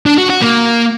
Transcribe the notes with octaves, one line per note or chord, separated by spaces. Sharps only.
D4
F#4
F#4
A#3